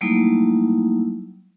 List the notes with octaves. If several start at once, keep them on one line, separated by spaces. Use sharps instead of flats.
F#3 G3 A3 A#3 D#4 E4